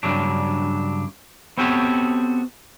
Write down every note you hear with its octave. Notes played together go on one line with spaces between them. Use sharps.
G2 C#3 F#3 D4
B3 C4 F#4 G4 A4 C#5